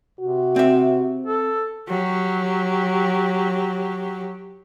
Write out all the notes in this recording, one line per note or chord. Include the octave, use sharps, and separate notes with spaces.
C3 F#4
C4 E5
A4
F#3 G4